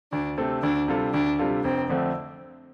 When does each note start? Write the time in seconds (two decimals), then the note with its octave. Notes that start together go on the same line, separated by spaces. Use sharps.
0.12 D2 D4
0.38 C3 A3 C4 A4
0.63 D2 D4
0.88 C3 G3 F4 A4
1.13 D2 D4
1.39 C3 G3 F4 A4
1.64 F1 C4
1.90 F2 D3 A3 C4